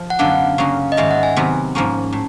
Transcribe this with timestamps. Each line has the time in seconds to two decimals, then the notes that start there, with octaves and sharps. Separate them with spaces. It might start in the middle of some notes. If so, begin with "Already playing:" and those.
Already playing: F3
0.10 F#5
0.19 F#2 D3 F#3 B3 D4 F5
0.58 C#3 F#3 A#3 C#4
0.92 D#5
0.97 G#2 D#3 G#3 E5
1.11 F#5
1.23 G#5
1.36 C3 D#3 F#3 B3
1.75 G#2 F3 A#3 C#4
2.13 A2